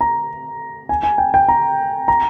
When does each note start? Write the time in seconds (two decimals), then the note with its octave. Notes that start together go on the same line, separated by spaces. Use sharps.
0.01 A#5
0.89 G#5
1.03 G#5
1.18 G5
1.34 G5
1.48 A#5
2.08 A#5